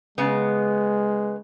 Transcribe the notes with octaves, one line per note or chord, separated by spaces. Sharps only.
C#3 G#3 B3